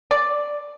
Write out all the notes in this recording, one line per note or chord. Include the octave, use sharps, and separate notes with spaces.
D5